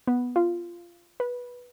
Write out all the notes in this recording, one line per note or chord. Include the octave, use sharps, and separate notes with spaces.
B3
F4
B4